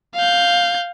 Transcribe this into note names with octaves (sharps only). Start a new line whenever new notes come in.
F5 G6